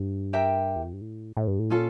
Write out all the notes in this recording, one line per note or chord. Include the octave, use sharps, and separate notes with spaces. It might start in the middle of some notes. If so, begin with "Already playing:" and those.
Already playing: G2
G4 A#4 E5 G5
E2
F2
G2
A2
A2
G2
A2
A#2 C#4 F4 A4